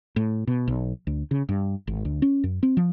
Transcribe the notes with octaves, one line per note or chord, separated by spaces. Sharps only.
A2
B2
B1
D2
C#3
G2
G#1
D2
C#4
F#2
C4
F3